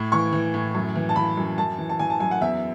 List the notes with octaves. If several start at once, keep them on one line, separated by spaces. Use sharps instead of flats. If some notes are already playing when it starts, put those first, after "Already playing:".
Already playing: A2
E3 C#6
E3
A2
F#2
E3
A5
E3 B5
F#2
F#2 A5
E3
A5
E3 G#5
A5
F#2 G#5
F#5
E2 E5